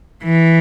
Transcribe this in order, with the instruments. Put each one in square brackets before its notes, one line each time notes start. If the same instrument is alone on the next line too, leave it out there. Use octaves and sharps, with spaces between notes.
[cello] E3